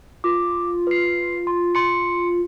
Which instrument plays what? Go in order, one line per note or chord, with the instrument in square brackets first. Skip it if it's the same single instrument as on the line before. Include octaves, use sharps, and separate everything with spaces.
[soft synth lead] F4 [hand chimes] D6
[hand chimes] B4 C7
C6
C6 C#7